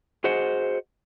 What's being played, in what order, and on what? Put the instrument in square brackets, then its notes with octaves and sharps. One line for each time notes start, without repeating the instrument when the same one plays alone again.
[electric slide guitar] F#4 G#4 C5 D#5 F#5